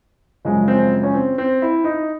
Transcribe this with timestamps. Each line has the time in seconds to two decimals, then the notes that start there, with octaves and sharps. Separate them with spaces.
0.45 F#2 C#3 F3 G#3
0.68 C4
1.03 C#4
1.14 C4
1.38 C4
1.62 E4
1.84 D#4